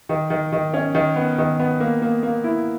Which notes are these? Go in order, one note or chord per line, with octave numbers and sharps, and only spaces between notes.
D#3
D#3
D#3
C#4
D#3
B3
D#3
B3
A#3
A#3
A#3
E4